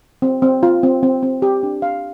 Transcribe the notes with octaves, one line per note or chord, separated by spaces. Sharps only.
C4
C4
F4
C4
C4
C4
G4
D4
F5